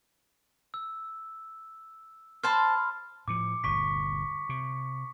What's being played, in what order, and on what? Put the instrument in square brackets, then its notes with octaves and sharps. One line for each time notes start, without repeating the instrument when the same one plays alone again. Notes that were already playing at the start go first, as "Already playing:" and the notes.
[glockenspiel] E6
[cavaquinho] C5 A5 [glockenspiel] B5 C6 F6
[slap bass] A2 F3 [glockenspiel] D6 C#7
[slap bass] G1 D2 A#2 [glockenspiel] C#6 B6
[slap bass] C3